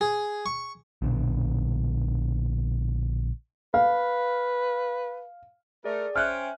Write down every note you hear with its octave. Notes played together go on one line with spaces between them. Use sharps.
G#4
C#6
A#1 B2 D3
B4 F5
A3 G#4 A#4 D5
C#4 C5 E5 G5 G#5 F6 F#6